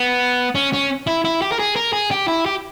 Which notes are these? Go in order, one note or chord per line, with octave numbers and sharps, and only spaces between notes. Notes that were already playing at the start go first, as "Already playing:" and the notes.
Already playing: B3
C#4
C#4
E4
E4
G4
A#4
G#4
A#4
G#4
G4
E4
G4